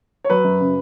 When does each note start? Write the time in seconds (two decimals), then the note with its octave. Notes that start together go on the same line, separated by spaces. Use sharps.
0.24 C#5
0.30 F#3 B4
0.44 F#2
0.60 C#3